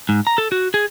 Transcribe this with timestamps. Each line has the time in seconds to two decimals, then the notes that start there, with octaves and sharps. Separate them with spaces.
0.09 G#2
0.27 A#5
0.38 A4
0.52 F#4
0.74 G#4